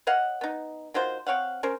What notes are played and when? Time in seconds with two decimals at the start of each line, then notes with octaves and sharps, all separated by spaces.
0.07 C#5 D#5 F5 F#5
0.41 B3 D#4
0.94 D#3 F#3 F4 C5
1.26 C4 C#5 F5 F#5
1.63 C#4 A#4 C5